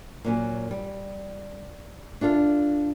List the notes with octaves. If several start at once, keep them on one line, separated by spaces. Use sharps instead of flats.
A#2 F#3 C#4
G3
D4 F4 A4 F5